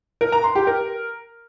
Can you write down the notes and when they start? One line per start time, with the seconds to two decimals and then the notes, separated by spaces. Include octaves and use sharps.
0.21 A#4
0.32 A#5
0.44 C6
0.55 G4
0.67 A#4